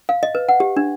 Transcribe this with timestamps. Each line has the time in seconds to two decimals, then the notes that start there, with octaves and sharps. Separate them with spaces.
0.09 F5
0.23 D#5
0.35 B4
0.49 F#5
0.60 G4
0.77 D4